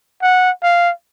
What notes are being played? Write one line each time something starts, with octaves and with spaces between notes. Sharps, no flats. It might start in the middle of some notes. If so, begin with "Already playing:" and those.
F#5
F5